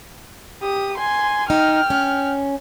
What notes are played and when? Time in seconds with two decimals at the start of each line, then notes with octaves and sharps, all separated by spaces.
0.62 G4 D#6
0.98 G#5 C6
1.50 D#4 G5 F6
1.90 C#4